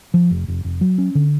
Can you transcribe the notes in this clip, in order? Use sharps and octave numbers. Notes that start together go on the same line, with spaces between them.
F3
F1
F1
F1
F#3
C#4
D3